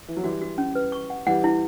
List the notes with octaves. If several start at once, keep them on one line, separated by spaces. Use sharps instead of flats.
E3
F#3
E3 G3 F#4
F#4
C#4
B4
C#6
F#5
E3 G3 F#5
E4